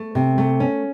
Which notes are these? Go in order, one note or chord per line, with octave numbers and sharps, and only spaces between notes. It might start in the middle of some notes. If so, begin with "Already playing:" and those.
Already playing: A3
C3
A3
C#4